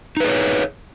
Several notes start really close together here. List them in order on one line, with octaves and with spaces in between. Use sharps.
D#4 B4 G#4 C#5